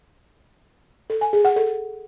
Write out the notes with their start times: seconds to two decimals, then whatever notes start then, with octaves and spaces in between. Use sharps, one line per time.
1.10 A4
1.21 G#5
1.33 G#4
1.45 F#5
1.56 A4